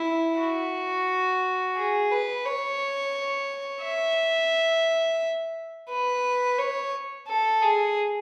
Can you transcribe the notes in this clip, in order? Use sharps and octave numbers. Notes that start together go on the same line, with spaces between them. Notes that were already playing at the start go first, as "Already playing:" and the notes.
Already playing: E4
F#4
G#4
B4
C#5
E5
B4
C#5
A4
G#4